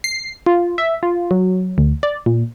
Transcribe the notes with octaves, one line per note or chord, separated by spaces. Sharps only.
C7
F4
E5
F4
F#3
D2
D5
A#2